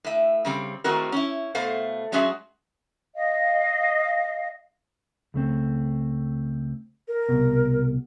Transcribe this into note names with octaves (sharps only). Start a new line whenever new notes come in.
A2 E5
C#3 G3 C4
A2 D#3 G#3 C4 F#4 A#4
C#4 E4
B2 A3 C5 F5
F#3 G#3 C#4 F#4 G#4 E5
D#5 F5
C#2 A3 C4
A#4
C2 B2